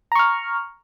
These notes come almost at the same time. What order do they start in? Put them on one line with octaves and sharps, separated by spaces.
A#5 C#6 F6